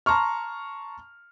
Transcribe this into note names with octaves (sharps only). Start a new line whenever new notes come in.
A5 A#5 C6 C#6 F6